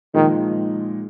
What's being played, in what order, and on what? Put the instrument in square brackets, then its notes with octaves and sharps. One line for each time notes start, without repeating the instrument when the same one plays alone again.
[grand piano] A#2 F3 G#3 D#4 [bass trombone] D#3